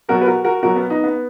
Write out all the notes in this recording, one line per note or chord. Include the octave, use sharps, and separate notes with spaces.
B2 F#3 F#4 A#4
B4
F#4 A#4
F#4 A#4
B2 F#3 F#4 A#4
B3
B3 D#4
B3